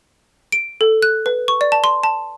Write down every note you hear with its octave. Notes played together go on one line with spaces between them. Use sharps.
D7
A4
F#6
B4
C#6
D5
A5
C6
A5